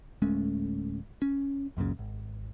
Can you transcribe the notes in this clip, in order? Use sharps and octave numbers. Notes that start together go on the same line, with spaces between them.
D1 G#3 A3 C#4
C#4
C#2 F#2 A#2 C#3
G#1